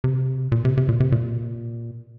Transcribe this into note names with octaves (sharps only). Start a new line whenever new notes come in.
C3
A#2
C3
C3
A#2
C3
A#2